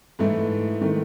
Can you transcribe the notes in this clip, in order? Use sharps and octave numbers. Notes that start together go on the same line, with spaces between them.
G#2 E3 A3 E4
D#3 A3